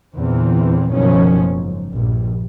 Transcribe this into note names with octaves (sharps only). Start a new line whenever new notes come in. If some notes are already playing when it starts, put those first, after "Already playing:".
E2 A#2 D3 E3 C4
F#1 B2 D#3 F3 F#3 C#4
G#2
A#1 G2